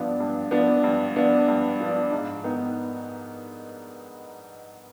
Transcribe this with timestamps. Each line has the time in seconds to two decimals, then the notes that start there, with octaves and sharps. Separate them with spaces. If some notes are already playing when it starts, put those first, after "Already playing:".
Already playing: G2 F3 B3 D4
0.20 G2
0.51 F3 B3 D4
0.84 G2
1.16 F3 B3 D4
1.48 G2
1.80 F3 B3 D4
2.12 G#2
2.44 D#3 B3 D#4